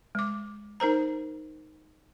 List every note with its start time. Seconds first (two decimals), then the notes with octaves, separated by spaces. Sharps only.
0.15 G#3 D6
0.80 D#4 A#4 C5 A#5